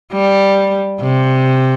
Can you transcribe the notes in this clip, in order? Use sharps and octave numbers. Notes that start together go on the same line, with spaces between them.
G3
C3